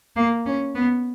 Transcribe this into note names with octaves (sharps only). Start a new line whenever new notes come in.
A#3
C#4
B3